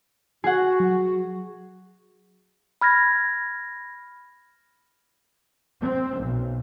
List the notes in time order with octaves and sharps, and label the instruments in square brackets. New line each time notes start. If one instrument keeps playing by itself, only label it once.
[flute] F#4 [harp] G#4 F#5
[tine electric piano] F#3
[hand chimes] B5 F6 G#6 A#6
[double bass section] C4
B1